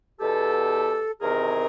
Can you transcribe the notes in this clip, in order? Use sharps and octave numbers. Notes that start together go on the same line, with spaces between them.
E2 B2 G4 A4
E2 C3 D#3 G#4 A#4